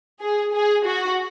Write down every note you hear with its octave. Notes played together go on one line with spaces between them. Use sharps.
G#4
G#4
F#4